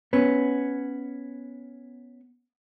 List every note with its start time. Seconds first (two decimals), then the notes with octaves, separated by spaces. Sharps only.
0.13 B3 C#4